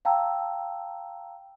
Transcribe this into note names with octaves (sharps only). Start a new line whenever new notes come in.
F5 G5 A5 A#5 E6